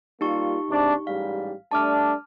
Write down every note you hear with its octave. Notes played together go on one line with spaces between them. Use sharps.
G3 A#3 D#4 F4 G4 C#6
G#2 C3 D4
A1 G#2 G3 F5
G3 A3 D4 A5 D6 F6